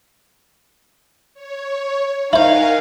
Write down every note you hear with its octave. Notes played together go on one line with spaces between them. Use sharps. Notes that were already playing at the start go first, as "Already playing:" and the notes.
C#5
D#4 E4 A#4 C5 F5 F#5 G#5